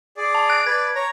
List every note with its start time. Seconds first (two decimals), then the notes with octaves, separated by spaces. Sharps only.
0.17 G#4 D5
0.35 A5
0.49 F#6 D7
0.67 B4 D5 G#6
0.95 C#5 A#5